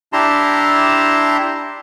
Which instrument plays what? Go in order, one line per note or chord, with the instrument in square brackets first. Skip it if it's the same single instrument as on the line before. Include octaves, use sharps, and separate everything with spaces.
[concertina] D4 E4 G4 A5 A#5 C6